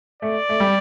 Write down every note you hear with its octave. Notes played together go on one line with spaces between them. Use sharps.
A3 D5
A3
G3